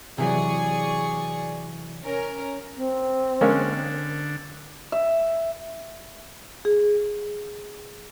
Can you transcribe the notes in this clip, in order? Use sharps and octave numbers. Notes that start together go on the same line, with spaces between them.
C3 E3 F#3 G#4 D5 C#6
C#4 A#4
C4
D3 G#3 A#3 C#4
E5
G#4